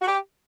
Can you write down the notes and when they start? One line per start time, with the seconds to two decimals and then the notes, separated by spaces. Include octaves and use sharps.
0.01 F#4
0.07 G4